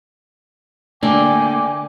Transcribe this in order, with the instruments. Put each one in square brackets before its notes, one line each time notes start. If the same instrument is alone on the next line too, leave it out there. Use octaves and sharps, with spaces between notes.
[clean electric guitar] D3 A#3 [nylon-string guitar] A3 D5 [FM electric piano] D4 [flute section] G5 G#5 D6